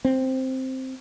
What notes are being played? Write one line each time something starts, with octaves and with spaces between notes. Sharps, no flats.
C4